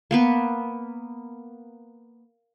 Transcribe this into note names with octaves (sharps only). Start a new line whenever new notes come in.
A#3 B3 B4